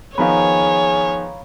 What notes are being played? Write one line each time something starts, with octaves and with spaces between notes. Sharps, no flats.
D#3 F3 B3 G#4 C#5 F5 A#5 B5